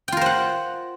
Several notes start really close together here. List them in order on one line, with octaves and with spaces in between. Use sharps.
G5 F4 A#4 C5 F#5